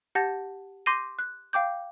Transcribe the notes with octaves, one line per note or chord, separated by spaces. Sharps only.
G4 F#5 A5 G6 A6 A#6
C6 D6 G6 A#6 C7 D#7
F#6
F5 G5 D6 G6